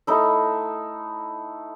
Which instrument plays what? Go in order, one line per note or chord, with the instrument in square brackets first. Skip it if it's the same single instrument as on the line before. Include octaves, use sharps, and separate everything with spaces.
[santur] A3 D#4 E4